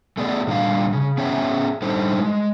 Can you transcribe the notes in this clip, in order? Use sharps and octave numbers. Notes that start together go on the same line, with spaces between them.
A3 B3 G#4 D5
A#2 D3 G3 F5
C#3
B3 C#4 G#4 C#5 E5 G5
D3 G3 D#4 A4 C5
G#3